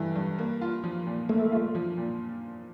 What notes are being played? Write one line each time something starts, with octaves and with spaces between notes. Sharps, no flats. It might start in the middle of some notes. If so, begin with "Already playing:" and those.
Already playing: G2 E3 A3
G2
A#3
F4
F3
A#2
A3 A#3
F4
F3
A#2